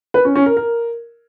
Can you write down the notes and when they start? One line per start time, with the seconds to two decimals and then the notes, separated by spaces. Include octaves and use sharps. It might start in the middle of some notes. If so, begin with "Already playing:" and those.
0.14 B4
0.25 C#4
0.35 C#4
0.46 A#4
0.57 A#4